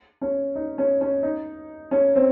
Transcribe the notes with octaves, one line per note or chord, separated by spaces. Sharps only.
C#4
D#4
C#4
C#4
D#4
C#4
C4